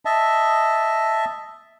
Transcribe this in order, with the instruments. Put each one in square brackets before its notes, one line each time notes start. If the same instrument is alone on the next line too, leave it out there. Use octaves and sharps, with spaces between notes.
[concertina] D#5 E5 A5